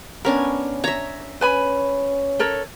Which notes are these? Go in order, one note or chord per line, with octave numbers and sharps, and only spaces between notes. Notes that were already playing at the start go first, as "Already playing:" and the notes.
B3 C#4 D4 A#4
C#5 E5 A#5
C#4 B4 G#5 B5
A4 A#4 C#5